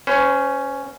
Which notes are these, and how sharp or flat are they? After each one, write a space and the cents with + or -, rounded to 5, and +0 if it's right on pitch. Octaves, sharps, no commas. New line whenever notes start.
C#4 +0 C5 -35